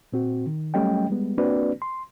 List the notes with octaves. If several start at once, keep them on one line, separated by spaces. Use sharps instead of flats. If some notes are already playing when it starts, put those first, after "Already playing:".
A#2 C4 F#4
D#3
F#3 G3 A3 C#4 D#5 G5
G3 G#3 B3
A#3 C4 D4 F#4 B4 D5
C6